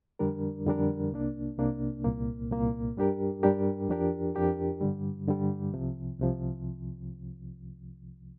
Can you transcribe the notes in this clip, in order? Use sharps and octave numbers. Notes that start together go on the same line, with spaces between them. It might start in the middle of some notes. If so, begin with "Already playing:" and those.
F2 D3 G3 D4 A#4
F2 D3 G3 D4 A#4
C2 C3 A#3 D4
C2 C3 A#3 D4
C2 A#2 A#3
C2 A#2 A#3
G2 G3 D4 G4 A#4
G2 G3 D4 G4 A#4
F2 F3 D4 G4 A#4
F2 F3 D4 G4 A#4
G2 D3 G3
G2 D3 G3
C2 C3 F3
C2 C3 F3